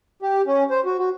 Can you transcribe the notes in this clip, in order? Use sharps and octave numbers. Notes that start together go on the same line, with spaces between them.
G4
C#4
C5
F#4
F#4